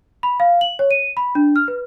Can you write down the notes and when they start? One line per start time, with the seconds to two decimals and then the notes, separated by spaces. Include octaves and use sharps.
0.23 B5
0.40 F5
0.61 F#7
0.79 C#5
0.91 D#7
1.17 B5
1.35 D4
1.56 F6
1.68 B4